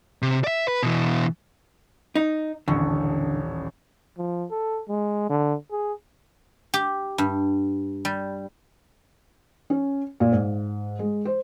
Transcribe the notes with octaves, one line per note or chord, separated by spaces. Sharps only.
C3
D5 E5
B4
B2 E3
D#4
D#1 A1 D3 C#6
F3
A4
G#3
D3
G#4
G4
G2
G3
C#4
A#2
G#2
G#3
C5